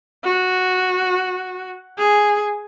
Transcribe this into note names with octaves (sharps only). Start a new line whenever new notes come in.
F#4
G#4